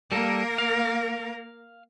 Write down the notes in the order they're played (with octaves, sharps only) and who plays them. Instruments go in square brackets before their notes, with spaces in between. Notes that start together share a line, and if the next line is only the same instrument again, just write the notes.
[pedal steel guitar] G3 A4 [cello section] A#3 A#4
[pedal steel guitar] F5